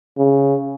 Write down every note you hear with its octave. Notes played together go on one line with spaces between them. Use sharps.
C#3